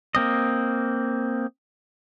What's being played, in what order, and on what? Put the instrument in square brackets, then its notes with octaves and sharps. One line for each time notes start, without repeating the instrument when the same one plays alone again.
[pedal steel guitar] A#3 C4 D#5